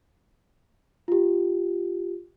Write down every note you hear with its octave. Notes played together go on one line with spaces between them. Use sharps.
F4 G4